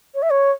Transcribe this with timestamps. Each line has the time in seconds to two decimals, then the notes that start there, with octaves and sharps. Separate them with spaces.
0.15 C#5
0.22 E5
0.30 C#5